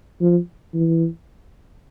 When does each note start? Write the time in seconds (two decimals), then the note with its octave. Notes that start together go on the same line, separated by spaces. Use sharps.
0.21 F3
0.74 E3